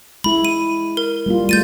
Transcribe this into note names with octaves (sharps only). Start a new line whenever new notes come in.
G#3 E4 B5
D#7
A#4
G3 A#3 F4
G#3 A3 G6 A6 D#7